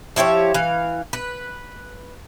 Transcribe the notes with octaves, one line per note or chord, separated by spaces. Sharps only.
F3 E4 G4 C#5
E3 F5
B4